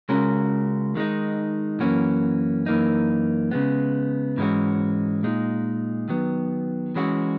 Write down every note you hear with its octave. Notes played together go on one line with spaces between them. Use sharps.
C#3 G#3 C#4 F#4 A#4
D#3 G#3 D#4
F#2 E3 A#3 C#4 F#4
F#2 E3 A#3 D#4
C#3 G#3 B3
G#2 E3 G#3 C#4 F#4
A#2 G#3 D#4
D#3 F#3 B3
E3 G#3 C#4 F#4